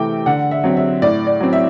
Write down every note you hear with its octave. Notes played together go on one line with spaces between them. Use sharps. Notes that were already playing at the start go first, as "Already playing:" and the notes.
Already playing: C3 E3 A3 G5 D6
D3 F#5
E5
F#3 C4
E5
A2 D5
D5
F#3 C4
E5